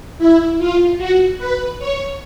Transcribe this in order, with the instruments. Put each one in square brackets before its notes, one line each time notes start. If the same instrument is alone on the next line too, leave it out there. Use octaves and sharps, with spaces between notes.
[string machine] E4
F4
F#4
B4
C#5